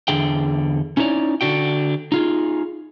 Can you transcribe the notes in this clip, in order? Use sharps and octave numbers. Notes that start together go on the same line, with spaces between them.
E2 D3 G#4 G5
C#4 D#4 E4 G4 C#5 D5
D3 D4 F#4 G5
D#4 F4 G#4